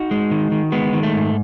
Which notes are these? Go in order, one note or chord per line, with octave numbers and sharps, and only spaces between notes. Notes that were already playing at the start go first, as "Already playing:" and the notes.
Already playing: D#4 F#4
G#3
D#3
D#3
G#3 B3
D#3
A3
G#2